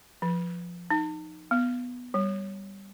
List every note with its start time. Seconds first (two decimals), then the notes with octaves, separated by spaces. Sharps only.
0.22 F3
0.90 D#4
1.51 B3
2.14 G3